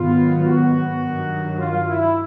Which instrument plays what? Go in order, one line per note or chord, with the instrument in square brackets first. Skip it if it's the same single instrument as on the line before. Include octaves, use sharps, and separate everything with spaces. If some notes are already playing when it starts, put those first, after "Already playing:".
Already playing: [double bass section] G#2 D#3 F#3 B3 [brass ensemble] F4
[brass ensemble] F#4
[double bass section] G2 D#3 F#3
[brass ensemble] F4
E4